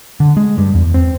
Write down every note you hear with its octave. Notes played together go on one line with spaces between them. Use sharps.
D3
G#3
G2
E2
C4